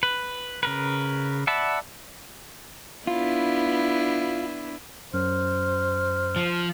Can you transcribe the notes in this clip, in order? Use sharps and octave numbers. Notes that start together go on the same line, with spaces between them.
B4
C#3 A#4 B4
D5 E5 F#5 A5 B5
B3 D4 E4 F4
F#2 C5 F6
F3